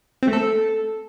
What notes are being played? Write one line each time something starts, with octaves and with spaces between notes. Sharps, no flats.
C4
A3
A4